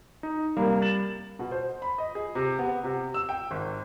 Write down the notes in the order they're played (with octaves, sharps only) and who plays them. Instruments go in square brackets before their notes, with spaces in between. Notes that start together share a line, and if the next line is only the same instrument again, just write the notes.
[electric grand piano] D#4
[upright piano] C3 A#3 [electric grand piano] G3
[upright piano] A6 E7 F#7
B2
C5
B5
D#5
G#4
C3
B3
C3
E6
G5
G#1